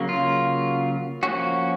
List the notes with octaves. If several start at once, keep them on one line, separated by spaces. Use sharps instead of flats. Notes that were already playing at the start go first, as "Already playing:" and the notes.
Already playing: C#3 F#3 A#3
F4
F3 A#3 C#4 F#4